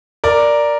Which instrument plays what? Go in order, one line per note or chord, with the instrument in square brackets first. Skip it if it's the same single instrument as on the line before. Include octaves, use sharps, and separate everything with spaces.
[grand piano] A#4 D5